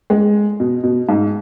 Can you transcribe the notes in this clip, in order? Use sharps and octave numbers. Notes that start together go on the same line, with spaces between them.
G#3
B2
B2
G#2